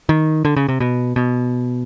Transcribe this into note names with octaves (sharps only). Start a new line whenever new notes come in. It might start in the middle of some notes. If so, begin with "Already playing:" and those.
D#3
D3
C#3
C3
B2
B2